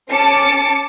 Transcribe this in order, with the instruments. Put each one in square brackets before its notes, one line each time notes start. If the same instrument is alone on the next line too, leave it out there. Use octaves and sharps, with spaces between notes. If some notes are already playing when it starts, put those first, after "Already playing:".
[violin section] C#4 A5 D6 C#7